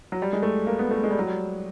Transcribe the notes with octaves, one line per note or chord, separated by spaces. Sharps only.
F#3
G3
G#3
A3
A#3
B3
A3
G#3
G3
F#3
G3